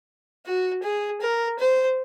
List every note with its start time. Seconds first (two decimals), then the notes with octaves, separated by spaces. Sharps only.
0.45 F#4
0.83 G#4
1.21 A#4
1.59 C5